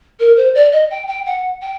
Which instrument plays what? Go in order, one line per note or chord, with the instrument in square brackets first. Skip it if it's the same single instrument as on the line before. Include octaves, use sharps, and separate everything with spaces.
[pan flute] A#4
C5
D5
D#5
G5
G5
F#5
G5